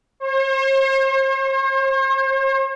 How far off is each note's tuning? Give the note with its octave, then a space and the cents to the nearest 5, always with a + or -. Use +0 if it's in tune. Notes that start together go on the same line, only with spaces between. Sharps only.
C5 +45